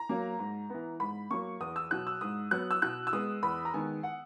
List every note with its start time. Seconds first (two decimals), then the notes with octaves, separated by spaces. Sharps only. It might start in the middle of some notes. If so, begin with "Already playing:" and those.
Already playing: A#5
0.09 F#3 A#3
0.39 G#2
0.70 E3 B3
1.00 G#2 B5
1.31 F#3 A#3 C#6
1.60 E2 D#6
1.76 E6
1.91 B2 F#3 F#6
2.07 E6
2.21 G#2 D#6
2.51 F#3 B3 F#6
2.71 E6
2.82 B2 F#6
3.07 E6
3.13 G#3 B3 D#6
3.42 E2 B5
3.65 A#5
3.73 D#3 G#3 B3 G#5
4.03 F#5